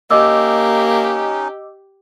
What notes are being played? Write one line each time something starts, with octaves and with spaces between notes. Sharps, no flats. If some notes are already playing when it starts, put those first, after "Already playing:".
A#3 C#4 D#4 G4 D#5 D6 E6